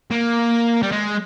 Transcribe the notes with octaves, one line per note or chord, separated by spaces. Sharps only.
A#3
G3
G#3